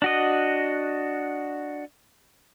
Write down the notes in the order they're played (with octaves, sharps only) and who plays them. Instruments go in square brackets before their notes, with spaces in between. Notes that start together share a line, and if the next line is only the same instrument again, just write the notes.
[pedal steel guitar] D4 F#4 D#5